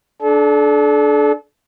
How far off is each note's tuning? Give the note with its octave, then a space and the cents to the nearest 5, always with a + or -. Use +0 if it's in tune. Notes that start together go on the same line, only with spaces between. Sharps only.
D4 +0 A4 -35